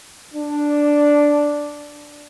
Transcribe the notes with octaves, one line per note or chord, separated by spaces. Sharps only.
D4